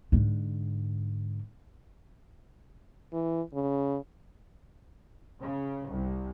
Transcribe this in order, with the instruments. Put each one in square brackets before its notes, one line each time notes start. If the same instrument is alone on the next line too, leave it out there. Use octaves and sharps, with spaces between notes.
[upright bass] G#2 D3
[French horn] E3
C#3
[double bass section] C#3
C2